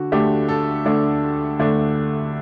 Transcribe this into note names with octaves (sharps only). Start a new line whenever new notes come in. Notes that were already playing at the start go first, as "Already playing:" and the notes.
Already playing: D3 D4 F#4
D2 D3 A3 D4 G4
A4
D2 D3 A3 D4
D2 D3 A3 D4